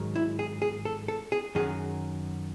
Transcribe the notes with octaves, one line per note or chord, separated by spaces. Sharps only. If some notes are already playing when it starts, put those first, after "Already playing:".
Already playing: G#2 D#3 F#3
E4
G#4
G#4
A4
A4
G#4
F#2 D#3 F#3 G#4